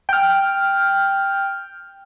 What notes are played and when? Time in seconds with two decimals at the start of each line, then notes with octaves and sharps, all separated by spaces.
0.09 G5 F6